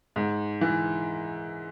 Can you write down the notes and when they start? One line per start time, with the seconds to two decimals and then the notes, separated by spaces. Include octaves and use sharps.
0.16 G#2
0.61 E3